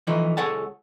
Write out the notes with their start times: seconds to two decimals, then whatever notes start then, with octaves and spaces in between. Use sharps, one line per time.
0.07 E3 F3 A3 D#4
0.37 C#2 G#4 A4 C#5 F#5 A5